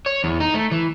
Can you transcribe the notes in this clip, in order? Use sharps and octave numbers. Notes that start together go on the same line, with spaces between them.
C#5
E2
D#4
A3
E3